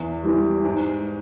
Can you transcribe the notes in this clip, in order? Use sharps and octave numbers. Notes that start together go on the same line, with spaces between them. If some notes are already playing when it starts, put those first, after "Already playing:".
Already playing: E2
E3 G3
G#2